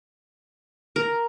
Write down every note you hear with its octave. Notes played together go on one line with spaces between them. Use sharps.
A#4